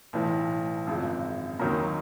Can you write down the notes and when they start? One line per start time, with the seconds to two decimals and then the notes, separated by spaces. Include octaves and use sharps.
0.13 B1 A2 E3
0.87 G#1 F#2 C#3 F3
1.60 D#2 D#3 F#3 A#3